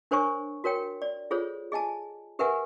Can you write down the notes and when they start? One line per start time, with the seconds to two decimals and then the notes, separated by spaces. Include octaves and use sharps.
0.11 D4 A#4 C5 C#5 G#5 C#6
0.64 F#4 A#4 C#5 G5
1.02 D5
1.31 F4 G#4 A4 C5 C#5
1.72 G#4 D#5 G#5 A5
2.39 G4 A#4 B4 E5 F#5 G#5